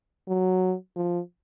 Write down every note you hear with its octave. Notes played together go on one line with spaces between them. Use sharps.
F#3
F3